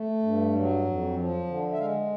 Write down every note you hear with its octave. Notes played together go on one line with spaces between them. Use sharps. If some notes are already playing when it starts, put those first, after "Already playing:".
Already playing: A3
G2
F#3
F2
F3
D3
E5
G#3 F5